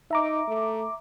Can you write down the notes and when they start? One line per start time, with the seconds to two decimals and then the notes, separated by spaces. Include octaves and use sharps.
0.11 D#4 E5 A#5 D6
0.48 A3